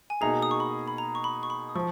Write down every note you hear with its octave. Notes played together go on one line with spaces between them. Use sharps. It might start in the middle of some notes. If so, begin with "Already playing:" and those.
G#5
B2 A#3 D#4 G#4 A#5
D#6
C#6
B5
B5
A#5
C#6
B5
C#6
B5
D#6
F3 C#6